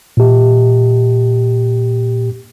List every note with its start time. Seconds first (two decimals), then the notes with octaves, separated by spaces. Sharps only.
0.17 A#2 G4